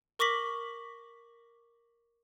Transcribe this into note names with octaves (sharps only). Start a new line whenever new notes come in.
A#4 C#6 D6 A#6 B6 F#7